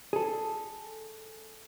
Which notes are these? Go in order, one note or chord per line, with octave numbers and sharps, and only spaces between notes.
G#4 A4